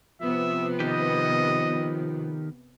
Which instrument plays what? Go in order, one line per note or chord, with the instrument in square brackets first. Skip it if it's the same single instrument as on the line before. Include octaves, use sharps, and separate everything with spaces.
[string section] C3 B3 [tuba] F3 [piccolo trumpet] E5
[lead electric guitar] D#3 G4 [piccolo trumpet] D#5